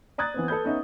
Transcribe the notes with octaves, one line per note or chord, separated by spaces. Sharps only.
D5 A#5 D#6 F#6 G#6 A6
E3 B3 C4
A4 B4 B5 G6
B3 C#4 D#4 D#5 E5